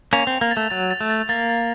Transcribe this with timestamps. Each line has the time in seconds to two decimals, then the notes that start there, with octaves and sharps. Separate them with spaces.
0.13 A#3 C#4 F7
0.27 C4
0.32 F7
0.41 A#3
0.51 A6
0.57 A3
0.70 F#3 A6
0.91 A6
1.01 A3
1.10 A6
1.29 A#3 A6
1.49 A6